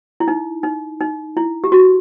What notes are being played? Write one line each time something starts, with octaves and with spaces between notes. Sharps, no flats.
E4
D#4
D#4
D#4
E4
G4
F#4